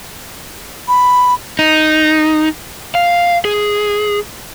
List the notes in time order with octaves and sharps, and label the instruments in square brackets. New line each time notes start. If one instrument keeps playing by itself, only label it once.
[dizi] B5
[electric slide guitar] D#4
F5
G#4